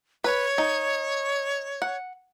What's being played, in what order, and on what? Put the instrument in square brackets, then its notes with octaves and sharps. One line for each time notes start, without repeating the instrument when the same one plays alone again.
[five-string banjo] B4 [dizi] C#5
[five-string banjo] D#4
F#5